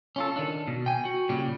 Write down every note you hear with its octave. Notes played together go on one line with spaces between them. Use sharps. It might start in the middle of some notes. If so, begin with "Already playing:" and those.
C#4 F4 A4
D#3 D4
B2
G5 G#5
F#4
A#2 C#3 G3 G4